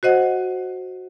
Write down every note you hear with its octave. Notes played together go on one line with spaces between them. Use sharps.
F#4 C5 D#5 F#5